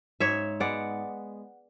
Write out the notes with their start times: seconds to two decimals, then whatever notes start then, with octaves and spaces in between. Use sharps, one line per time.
0.20 G#2 C#5 E5
0.60 G#3 B3 D5 F#5